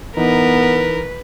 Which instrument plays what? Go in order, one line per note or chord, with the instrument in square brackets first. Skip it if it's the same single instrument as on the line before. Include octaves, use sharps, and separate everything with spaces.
[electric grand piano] E3 D#4 [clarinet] B3 [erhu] A#4 [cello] B4